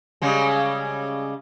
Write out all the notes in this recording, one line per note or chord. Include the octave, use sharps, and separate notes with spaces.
C#3 G3 G#3